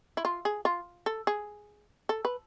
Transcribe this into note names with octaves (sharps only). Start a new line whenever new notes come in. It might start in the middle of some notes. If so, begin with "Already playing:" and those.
E4
F4
G#4
F4
A4
G#4
A4
B4